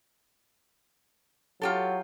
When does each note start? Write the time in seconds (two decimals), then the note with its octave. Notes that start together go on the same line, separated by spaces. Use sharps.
1.62 F#3 F4 G4 A4